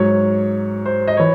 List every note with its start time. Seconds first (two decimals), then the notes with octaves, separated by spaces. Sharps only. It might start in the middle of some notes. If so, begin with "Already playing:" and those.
Already playing: G#2 F#3 C#5
0.86 C5
1.08 D#5
1.17 E3 C#5